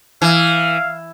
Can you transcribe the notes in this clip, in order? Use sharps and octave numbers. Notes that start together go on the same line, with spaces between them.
E3 F5